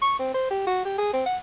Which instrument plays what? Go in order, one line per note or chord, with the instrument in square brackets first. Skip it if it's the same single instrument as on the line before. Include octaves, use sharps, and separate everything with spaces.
[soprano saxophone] C#6
C4
C5
G4
F#4
G4
G#4
C4
F#5